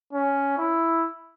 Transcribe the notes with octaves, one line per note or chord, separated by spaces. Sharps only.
C#4
E4